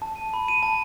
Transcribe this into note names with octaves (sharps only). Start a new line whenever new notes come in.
A5
D#7
B5
D#7
A5